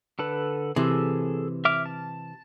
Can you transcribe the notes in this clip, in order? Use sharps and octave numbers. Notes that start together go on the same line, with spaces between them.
D3 A4 B4
C3 E3 G#4 A4
E5 D6 F6
A5